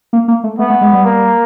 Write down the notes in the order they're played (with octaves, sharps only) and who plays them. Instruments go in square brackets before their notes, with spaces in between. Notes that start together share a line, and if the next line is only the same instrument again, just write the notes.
[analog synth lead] A#3
A#3
A3
[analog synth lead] A3 [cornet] B3
[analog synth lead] A3
G#3
G3
[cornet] A#3